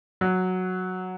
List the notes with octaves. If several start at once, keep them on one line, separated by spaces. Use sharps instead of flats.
F#3